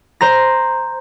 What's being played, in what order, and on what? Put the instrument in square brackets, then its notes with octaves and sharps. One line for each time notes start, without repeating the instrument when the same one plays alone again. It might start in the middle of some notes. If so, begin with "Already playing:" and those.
[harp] C5 A#5 A#6